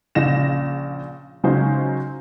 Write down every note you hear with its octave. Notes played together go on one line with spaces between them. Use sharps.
A#1 C#3 A#6 E7
C#3 F#3 G#3 C#4 D#4 C5